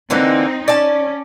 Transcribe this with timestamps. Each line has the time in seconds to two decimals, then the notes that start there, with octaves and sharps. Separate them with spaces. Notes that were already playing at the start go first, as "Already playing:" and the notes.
0.10 D3 E3 A#3 C4 D#4
0.68 C#4 D5 A5